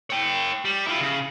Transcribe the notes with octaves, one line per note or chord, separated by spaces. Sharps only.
C#5 G5
G3
E4 F4
C#3